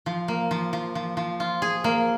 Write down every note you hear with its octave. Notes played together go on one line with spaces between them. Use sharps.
F3
A#3
F3
F3
F3
F3
F4
G#4
A#3